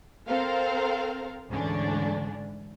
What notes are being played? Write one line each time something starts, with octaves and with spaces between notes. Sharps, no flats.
C4 A4 A#4 C5 F5 A#5
D2 G#2 D3 E3 C#4 D4